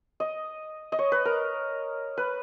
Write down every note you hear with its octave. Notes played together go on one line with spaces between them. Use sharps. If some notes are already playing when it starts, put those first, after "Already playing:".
D#5
D#5
C#5
B4
A#4
B4